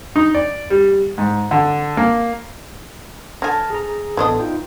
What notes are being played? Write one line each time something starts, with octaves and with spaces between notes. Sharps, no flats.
D#4
D5
G3
G#2
D3
A#3
D3 G#5 A5 F6 A#6
G#4 A#5
A1 E3 B3 D4 A4 D#5
D#4 F4 G5